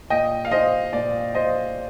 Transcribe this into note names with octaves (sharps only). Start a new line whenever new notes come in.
A#2 D#5 G5
F5
C5 D#5
A#2 D5
C5 D#5